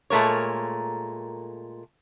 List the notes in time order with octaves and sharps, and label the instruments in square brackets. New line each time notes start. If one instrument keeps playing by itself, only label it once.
[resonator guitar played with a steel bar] A#2 G#3 A3 A#4 C#5